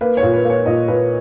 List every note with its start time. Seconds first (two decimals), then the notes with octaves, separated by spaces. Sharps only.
0.01 A#3 B4
0.17 C#5
0.23 A#2
0.33 B4
0.45 A#3 C#5
0.66 A#2 D#5
0.88 A#2 B4